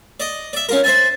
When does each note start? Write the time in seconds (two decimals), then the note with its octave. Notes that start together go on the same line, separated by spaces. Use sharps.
0.20 D5 D#5
0.53 D5 E5
0.69 C#4 F4 A#4
0.84 C5 E5 G#5 A6